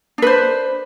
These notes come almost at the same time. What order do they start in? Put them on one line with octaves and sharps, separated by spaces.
D4 B4 C5